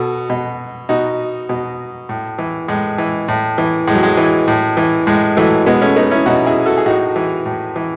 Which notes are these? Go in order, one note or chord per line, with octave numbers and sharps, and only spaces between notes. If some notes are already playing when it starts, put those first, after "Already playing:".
Already playing: B2 F#4 A4
B2
B2 D#4 F#4
B2
A2
E3
A2 G#3
E3
A2
E3
A2 G#3
F#3
G#3
E3
A2
E3
A2 G#3
E3 F#3 A3
B2 G#3 B3
A3 C#4
B3 D#4
C#4 E4
B2 D#4 F#4
E4 G#4
F#4 A4
G#4
A2 D#4 F#4
E3
A2
E3